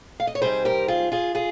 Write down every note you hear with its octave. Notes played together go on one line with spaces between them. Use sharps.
F5
D#5
C#5
C3 G3 C4 D#4 G#4 C5
G4 A#4
F4 G#4
F4 G#4
F4 G#4